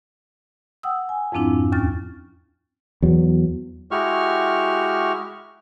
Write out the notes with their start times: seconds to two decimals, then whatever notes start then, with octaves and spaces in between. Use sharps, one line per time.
0.83 F#5 G5 D#6 E6
1.09 G#5
1.32 F2 G#2 F3 C4 D4 E4
1.72 D#2 C#4 F6 A6
3.02 E2 F#3
3.91 G#3 E4 F#4 G4 C#6 F6